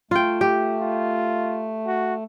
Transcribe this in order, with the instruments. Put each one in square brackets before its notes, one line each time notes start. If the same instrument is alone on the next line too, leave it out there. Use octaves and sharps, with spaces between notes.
[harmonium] A3 [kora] F4 G5
[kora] G4
[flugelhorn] F4
F#4